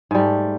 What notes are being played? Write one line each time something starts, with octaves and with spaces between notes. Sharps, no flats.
G#2 G3 A3